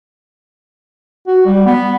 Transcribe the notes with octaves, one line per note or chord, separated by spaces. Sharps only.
F#4
G3
B3